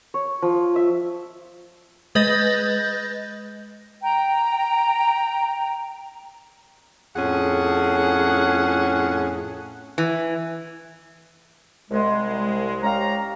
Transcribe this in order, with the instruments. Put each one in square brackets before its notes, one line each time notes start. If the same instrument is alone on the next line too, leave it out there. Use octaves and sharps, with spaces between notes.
[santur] C#5
F3
E5
[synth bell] G#3 B4 D#5 G6 A6 A#6
[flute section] G5 A#5
[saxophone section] F2 A2 C#4 G#4 F#5
[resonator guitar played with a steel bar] E3
[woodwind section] C2 G#3
C#4 G4 F5 A#5